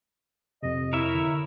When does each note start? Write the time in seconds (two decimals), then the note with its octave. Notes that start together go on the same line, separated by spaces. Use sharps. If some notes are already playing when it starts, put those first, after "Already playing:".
0.63 F2 C3 D#5
0.93 E4 A#4 C#5 E5
1.15 D3